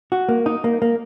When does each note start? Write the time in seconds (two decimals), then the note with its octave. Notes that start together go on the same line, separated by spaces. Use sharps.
0.12 F#4
0.29 A#3
0.46 D#4
0.64 A#3
0.82 A#3